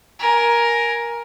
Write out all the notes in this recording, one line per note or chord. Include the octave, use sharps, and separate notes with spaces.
A#4 G#5